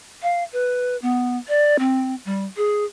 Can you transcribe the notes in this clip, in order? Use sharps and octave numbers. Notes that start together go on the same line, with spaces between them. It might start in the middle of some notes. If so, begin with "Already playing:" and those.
F5
B4
B3
D5
C4
G3
G#4